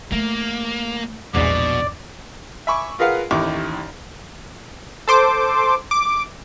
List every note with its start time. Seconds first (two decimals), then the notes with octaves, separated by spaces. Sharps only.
0.12 A3 A#3
1.35 A#1 E2 G#2 B2 D5
2.67 E5 G#5 B5 C#6 D6
2.99 F4 G#4 A#4 B4 F5 F#5
3.31 A1 D#2 D#4 E4 C#6 D6
5.08 A4 C5 D6
5.91 D6